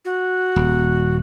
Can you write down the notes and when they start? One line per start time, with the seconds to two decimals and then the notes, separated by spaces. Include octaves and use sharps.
0.05 F#4
0.56 D#1